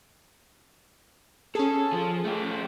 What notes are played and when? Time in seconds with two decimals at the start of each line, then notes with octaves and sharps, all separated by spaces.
1.55 C#4 G#4 A4
1.92 F3
2.25 A3 G4